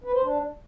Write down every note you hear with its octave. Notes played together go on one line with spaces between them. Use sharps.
B4
C5
D4